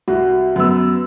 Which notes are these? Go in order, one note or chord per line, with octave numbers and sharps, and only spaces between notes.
C2 F#4
F#2 B3 E6